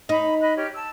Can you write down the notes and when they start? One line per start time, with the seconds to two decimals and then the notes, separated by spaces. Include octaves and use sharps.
0.09 D#4 B5
0.41 D#5 B5 F#6
0.56 G4 C#5 F6
0.74 A5 E6